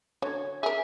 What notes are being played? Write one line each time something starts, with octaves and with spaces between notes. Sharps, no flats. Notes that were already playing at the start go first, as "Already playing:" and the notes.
D3 C#5
G#4 A#4 E5